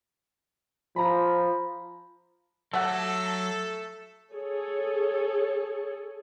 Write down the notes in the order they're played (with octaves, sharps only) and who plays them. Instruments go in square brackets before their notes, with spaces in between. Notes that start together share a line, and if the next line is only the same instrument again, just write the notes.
[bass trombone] F3 [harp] A#5 B5
[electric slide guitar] F#3 [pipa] A3 G4 F#5 [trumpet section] A4
[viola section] G#4 A4 C#5